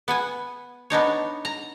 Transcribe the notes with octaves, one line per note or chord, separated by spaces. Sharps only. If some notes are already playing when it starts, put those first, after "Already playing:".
B3 F#5 G#5
B3 D4 D#4 C#5
A#5